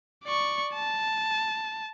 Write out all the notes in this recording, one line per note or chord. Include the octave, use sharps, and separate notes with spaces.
D5 C#6
A5